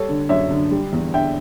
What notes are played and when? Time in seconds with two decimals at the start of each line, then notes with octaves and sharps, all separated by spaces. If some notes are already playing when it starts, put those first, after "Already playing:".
Already playing: G3 A4 C#5
0.09 D3
0.29 F#2 C#5 E5
0.51 D3
0.71 G3
0.93 E2
1.14 D3 E5 G5